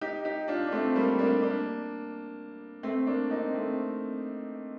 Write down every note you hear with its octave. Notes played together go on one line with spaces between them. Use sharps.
D#4 G4
D#4 G4
D4 F4
D4
A3 C4
G3 A#3
A#3 D4
A#3 D4
A3 C4
A#3 D4
C4 D#4
A3 C4